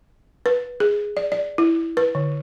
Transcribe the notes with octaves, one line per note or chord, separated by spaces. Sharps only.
B4
G#4
D5
D5
E4
B4
D3